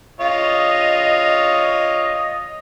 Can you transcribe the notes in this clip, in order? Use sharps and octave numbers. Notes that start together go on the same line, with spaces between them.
F4 C#5 D#5